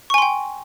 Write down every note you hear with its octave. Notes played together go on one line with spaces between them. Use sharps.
G5 G#5 C6 C#6